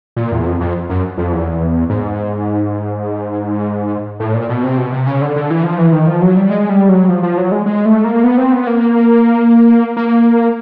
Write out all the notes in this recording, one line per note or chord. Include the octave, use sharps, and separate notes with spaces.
A#2
E2
F2
F2
F#2
F2
E2
G#2
A2
A#2
B2
C3
B2
C3
C#3
D3
D3
E3
F3
E3
D#3
F3
F#3
G3
G#3
G3
F#3
F3
F3
F#3
G#3
G#3
A3
A#3
B3
C4
B3
A#3
A#3